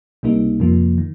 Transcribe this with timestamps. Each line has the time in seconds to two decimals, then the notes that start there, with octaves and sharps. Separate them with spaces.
0.23 C#2 C3 G3 A#3 D#4
0.60 F2 C3 F3 A#3
0.98 D#3